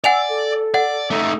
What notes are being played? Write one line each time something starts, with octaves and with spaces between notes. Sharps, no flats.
D5 F#5 G#5 E6 F7
A4
D5 F#5
A3 D#4